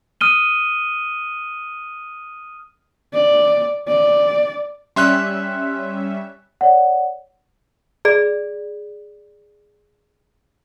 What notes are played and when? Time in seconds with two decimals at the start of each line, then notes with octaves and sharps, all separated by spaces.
0.21 D#6 F6 D#7 G7
3.14 D5
3.88 D5
4.96 G3 C#4 E5 C6 F#6
6.61 C#5 D5 F#5
8.05 G#4 D5 B5